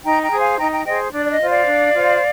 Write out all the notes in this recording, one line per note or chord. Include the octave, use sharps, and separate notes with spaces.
D#4 G5 A#5
G5 A#5
G#4 C5
F5 G#5
D#4 G5 A#5
G5 A#5
G#4 C5 D#5 G5
D4 D5
D5
D#5
F4 C5
D5 F5
D4
F4 C5